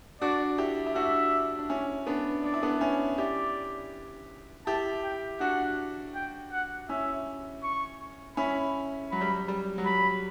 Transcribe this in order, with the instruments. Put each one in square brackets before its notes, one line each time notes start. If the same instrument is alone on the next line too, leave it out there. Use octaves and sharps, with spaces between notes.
[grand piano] D4 F#4 [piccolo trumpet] D5
[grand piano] E4 G4
E4
[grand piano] D4 F#4 [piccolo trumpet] E5
[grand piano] D4
C#4 E4
B3 D4
[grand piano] D4 [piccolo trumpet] D5
[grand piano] E4
B3 D4
C#4 E4
[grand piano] E4 G4 [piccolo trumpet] D5
[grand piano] E4 G4 [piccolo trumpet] A5
[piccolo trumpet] G5
[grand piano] D4 F#4 [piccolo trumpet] F#5
[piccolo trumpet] G5
F#5
[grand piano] C#4 E4 [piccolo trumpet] E5
[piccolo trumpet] C#6
[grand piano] C#4 E4 [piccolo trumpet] B5
[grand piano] F#3 [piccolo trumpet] B5
[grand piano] G3
F#3
G3
F#3
[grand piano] G3 [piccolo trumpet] B5